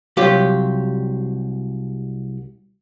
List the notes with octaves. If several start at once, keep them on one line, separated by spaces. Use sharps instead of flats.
C2 F#3 F4 G4